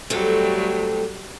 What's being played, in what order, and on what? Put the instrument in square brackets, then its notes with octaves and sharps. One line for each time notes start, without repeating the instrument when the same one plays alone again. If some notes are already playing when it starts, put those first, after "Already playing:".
[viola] F#3 G3 [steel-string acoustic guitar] A3 C4 A4